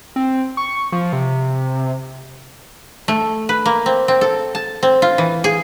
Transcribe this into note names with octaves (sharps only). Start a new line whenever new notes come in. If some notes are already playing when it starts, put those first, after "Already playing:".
C4
C#6
F3
C3
A3
B4
A#3
C4
C4
A4
A5
C4
F4
E3
G#4